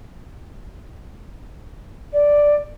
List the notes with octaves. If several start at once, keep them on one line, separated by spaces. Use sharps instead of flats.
D5